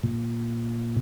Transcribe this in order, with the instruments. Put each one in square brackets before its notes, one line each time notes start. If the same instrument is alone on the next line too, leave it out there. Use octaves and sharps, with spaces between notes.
[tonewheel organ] A#2